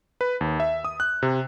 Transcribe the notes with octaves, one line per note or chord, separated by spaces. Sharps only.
B4
D#2
E5
D#6
F#6
C3